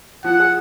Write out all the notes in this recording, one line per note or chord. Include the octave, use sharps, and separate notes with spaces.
F3 F#5
G#4